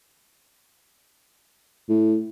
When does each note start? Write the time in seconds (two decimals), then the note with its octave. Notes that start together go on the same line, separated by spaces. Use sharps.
1.89 A2